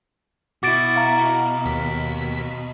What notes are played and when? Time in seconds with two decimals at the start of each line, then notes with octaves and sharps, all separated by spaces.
0.63 B2 E4 F#4 D6 A6 D7
0.96 F5 A#5
1.66 D#2 B6